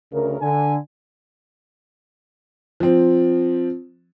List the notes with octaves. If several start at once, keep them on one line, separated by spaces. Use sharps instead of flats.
D2 C#3 A#4
D3 G#5
F3 C4